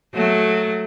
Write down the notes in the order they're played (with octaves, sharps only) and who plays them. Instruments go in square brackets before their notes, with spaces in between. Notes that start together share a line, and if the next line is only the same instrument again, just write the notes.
[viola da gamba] F#3 A3